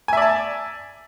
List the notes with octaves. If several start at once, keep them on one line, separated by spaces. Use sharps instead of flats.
D5 E5 G#5 A5